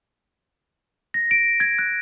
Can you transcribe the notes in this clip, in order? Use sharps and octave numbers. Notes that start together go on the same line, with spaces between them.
A#6
D7
G#6
F#6